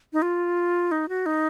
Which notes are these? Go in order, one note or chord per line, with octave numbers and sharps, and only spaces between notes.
D#4
F4
D#4
F#4
D#4